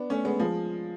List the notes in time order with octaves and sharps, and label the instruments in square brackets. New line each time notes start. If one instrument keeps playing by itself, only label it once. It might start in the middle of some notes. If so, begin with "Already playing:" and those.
Already playing: [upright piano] B3 D4
A3 C#4
G#3 B3
F3 G#3